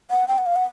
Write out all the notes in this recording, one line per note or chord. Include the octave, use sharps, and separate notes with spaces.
F#5
G5
F#5
F5
F#5